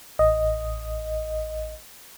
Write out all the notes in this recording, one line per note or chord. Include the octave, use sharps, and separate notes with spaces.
A1 D#5